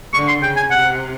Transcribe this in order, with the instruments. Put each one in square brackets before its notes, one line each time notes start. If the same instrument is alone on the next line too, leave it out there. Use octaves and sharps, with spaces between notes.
[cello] D3 [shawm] C#6
[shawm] C6
[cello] C#3 [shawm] G5
[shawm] G#5
[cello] C3 [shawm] F#5